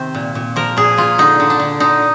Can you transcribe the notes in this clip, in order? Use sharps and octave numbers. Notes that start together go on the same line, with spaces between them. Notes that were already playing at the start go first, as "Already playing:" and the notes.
Already playing: C3 D#3 C5
A#2
A#2
F3 A#4
A#2 G#4
A#2 F4
D3 D#4
D3
D4
D3
D3 D#4